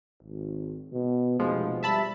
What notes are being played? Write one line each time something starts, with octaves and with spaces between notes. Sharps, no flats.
G#1
B2
F1 B2 F3 G#3
G3 E5 A5 B5